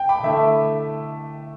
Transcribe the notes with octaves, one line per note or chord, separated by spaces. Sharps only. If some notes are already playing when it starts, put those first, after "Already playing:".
Already playing: G5
B5 D6
D3 A3 E4 E5